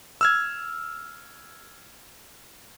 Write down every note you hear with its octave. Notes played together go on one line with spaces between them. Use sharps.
E6 F6 G#6